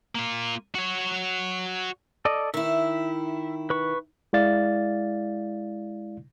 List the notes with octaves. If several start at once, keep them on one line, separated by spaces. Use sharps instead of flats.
A#3 F4
F#4 C#5
A4 D5 D#5
D#3 E4 E5
B4 C#6
G#3 E4 D5 F5 A6